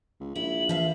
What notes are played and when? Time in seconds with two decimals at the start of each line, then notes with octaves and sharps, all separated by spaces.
0.20 C#2
0.36 A#1 E4 F#7
0.69 E3 F3 E5 F5